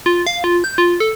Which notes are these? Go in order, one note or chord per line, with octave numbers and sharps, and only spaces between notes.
F4
F5
F4
G6
F4
A4